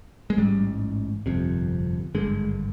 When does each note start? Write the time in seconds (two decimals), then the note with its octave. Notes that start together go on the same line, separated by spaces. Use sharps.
0.30 G#3
0.38 A1 G#2 G3
1.26 G1 F2 C3
2.15 G#1 G2 D3 G#3